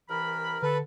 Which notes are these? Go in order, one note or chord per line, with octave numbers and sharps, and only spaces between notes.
C2 E3 A#4 B5
D3 A4 B4